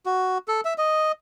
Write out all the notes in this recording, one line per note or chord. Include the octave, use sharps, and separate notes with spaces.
F#4
A4
E5
D#5